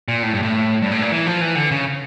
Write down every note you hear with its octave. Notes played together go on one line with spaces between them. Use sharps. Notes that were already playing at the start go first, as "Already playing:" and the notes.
A#2
A2
G2
A2
G2
A2
A#2
E3
F3
E3
D3
C#3